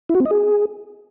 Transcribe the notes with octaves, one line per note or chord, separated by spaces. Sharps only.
E4
F#4
C4
D#5
G#4